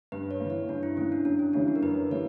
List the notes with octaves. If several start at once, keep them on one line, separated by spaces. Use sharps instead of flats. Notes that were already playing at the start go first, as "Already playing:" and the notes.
G2 B4
C#5
E3 A#3
C#5
G2 D4
E4
E3 A#3 C#4
D4
F#2 D4
C#4
E3 G3 A#3 C#4 D4
D4
A#4
F#2 B4
E3 G3 A#3 C#5